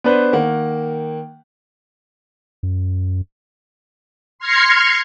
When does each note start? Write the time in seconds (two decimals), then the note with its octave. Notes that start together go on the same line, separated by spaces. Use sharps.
0.04 B3 D4 B4 C5
0.33 D#3 A#3 F#5
2.63 F#2
4.39 C6 F6 G#6 A#6 C7 C#7